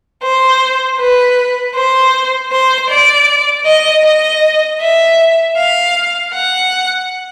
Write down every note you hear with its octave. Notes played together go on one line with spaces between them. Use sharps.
C5
B4
C5
C5
D5
D#5
D#5
E5
F5
F#5